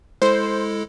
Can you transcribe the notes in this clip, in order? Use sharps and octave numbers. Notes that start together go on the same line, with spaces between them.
G#3 E4 A4 C5